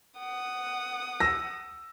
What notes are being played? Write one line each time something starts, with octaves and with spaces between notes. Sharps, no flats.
F#5 D#6
E6 A#6